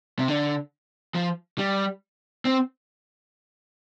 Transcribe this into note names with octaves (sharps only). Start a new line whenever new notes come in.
C3
D3
F3
G3
C4